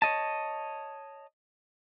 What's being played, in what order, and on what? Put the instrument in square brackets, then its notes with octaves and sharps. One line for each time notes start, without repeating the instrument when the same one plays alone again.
[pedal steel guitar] C#5 D#5 A5